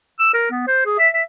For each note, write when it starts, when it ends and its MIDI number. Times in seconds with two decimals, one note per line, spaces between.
0.20 0.33 88
0.34 0.48 70
0.51 0.66 59
0.68 0.84 72
0.86 0.96 68
0.99 1.08 76
1.14 1.22 76